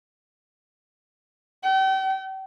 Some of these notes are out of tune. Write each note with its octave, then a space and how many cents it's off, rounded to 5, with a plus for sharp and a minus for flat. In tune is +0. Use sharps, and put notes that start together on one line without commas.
G5 -40